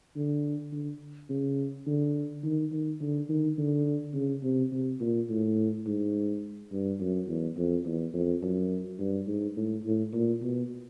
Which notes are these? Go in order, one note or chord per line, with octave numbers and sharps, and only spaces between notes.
D3
D3
C#3
D3
D#3
D#3
D3
D#3
D3
C#3
C3
C3
A#2
A2
G#2
G2
F#2
E2
F2
E2
F2
F#2
G2
G#2
A2
A2
A#2
B2